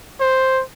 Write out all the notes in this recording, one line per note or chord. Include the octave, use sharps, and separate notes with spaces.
C5